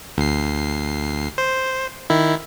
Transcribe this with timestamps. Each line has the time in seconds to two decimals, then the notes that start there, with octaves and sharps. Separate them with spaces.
0.18 D2 C7
1.38 C5
2.10 D#3 E4